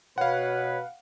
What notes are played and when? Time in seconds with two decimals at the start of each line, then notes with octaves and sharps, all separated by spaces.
0.18 B2 B4 C#5 F5 F#5